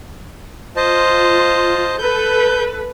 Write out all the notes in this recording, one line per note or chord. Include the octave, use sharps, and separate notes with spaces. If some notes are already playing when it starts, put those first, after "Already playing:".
F4 C5 D#5 A5
A4 B4 G6